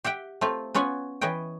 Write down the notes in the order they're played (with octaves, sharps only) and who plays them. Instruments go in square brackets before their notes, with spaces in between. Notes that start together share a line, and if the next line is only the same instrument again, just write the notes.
[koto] G4 E5 F#5 G5
A3 C4 F4
B3 C#4 F4 C#5 F#5 G#5
E3 B4 C#5 D#5 G5